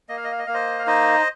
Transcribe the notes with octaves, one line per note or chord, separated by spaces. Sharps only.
A#3 D#5
F5
D#5
F5
D#5
A#3 F5
C5 D#5
F5
D#4 C5 D#5